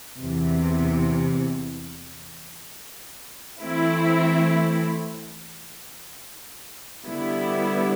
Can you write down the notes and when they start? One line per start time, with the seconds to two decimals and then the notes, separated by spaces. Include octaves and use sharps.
0.19 E2 C3 E3
3.61 E3 A3 C4 E4
7.05 D3 G3 B3 E4